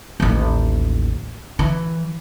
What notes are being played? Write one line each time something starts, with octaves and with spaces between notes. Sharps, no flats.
A1 D#2
E3